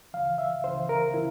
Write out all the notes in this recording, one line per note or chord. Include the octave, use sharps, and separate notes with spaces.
C#2 C#3 E3 F5
E5
C#2 C#3 E3 C5
A#4
C#3 E3 E4